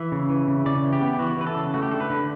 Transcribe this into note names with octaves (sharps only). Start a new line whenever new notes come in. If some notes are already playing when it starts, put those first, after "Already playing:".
Already playing: E3 E5
C#3
E3
C#3
C#3 D5
E3
G4
B3
E3 F#4
E3 B4
A4
C#3
A3 F#4
G4
D3 A4
B4
D3